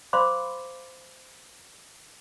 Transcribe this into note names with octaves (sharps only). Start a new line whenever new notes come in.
C5 F5 B5 C6 D6